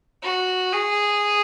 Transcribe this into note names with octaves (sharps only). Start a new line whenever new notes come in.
F#4
G#4